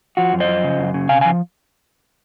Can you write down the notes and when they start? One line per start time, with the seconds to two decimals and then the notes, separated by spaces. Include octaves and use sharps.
0.17 F3 F#4
0.33 F#2
0.40 C5 D#5
0.48 F3
0.64 C#3
0.78 F#2
0.94 C#3
1.09 C3 F5 G#5
1.21 F5 G#5
1.25 F3